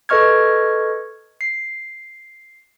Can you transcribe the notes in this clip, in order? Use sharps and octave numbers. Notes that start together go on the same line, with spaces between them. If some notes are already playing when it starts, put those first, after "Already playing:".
A4 B4 D#5 C#6 F6 G#6
C7